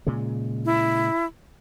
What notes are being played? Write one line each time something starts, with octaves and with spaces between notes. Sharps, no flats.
A#2 C#3 G#3
E4